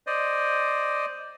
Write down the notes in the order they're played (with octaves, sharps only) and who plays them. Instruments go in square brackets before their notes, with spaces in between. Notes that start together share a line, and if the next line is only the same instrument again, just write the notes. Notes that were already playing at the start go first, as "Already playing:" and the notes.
[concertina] C5 D5 D#5